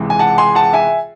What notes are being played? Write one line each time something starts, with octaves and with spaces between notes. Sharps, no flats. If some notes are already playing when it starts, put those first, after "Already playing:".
Already playing: C#2 C3 E3
G#5
F#5 A5
G#5 C6
F#5 A5
E5 G#5